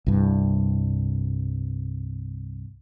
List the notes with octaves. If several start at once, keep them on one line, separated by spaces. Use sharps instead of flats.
C2 G2